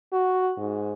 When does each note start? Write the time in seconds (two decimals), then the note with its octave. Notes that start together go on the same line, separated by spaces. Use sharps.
0.13 F#4
0.57 G#2